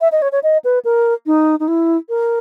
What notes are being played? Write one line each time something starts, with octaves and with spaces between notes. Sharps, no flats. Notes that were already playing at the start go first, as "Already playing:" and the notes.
E5
D#5
C#5
C#5
D#5
B4
A#4
D#4
D#4
E4
A#4